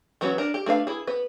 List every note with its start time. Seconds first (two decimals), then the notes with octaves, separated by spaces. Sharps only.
0.21 E3 F#3 B3 C#4 F#4
0.38 D4 A#4
0.54 G4
0.66 A3 D4 B4 F5
0.87 E4 G#4
1.07 B3 B4